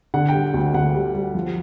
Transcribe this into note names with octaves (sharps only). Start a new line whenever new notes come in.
D3 F#5
G5
G3
D2
D2 F#5
G3
G3
F3